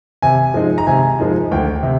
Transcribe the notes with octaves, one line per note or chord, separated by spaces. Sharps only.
C3 G#5
F3 G#3 D#4
A#5
C3 G#5
F3 G#3 D#4
D2 G5
C3